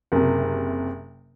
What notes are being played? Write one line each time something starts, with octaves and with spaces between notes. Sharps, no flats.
F#1 C3